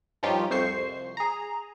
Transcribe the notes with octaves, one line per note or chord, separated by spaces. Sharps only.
G2 F3 C#4 D#4 F4 G4
C2 F2 C5 C#6 C7
G#4 A#5